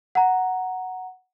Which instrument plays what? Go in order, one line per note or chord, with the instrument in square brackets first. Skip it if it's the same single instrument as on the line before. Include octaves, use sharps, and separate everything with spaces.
[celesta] F#5 A#5